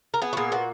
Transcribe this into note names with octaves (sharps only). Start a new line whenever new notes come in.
A#4
B3 G#4
F#4
A#2 G#4
B3 F#4